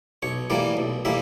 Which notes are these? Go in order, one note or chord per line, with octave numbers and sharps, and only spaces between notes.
B1 C#5
A2 E3 G3 A#3 D5
B1
A2 E3 G3 A#3 E5